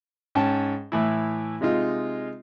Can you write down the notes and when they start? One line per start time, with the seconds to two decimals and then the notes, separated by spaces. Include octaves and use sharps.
0.35 G#2 C#4 G5 A5
0.92 A2 E3 E4
1.61 C3 G#3 D#4 F4